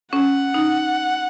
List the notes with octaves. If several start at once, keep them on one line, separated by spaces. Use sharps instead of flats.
C#4 F#5
D#4